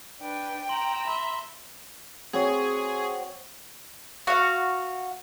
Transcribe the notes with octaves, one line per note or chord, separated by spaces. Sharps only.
D4 B4 G5
A#5 C6 E6 F#7
E5 B5 C6 G7
C4 F#4 G#4 C#5
F#4 F5